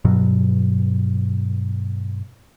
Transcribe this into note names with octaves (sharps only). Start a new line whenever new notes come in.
G2 B2 F#3